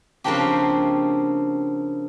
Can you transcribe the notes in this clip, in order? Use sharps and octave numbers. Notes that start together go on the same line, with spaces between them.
C#3 F3 A#3 C4 D4 G4